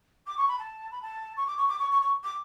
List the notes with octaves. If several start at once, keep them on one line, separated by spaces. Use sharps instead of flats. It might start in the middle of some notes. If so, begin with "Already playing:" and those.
D6
C#6
B5
A5
B5
A5
C#6
D6
C#6
D6
C#6
C#6
C#6
D6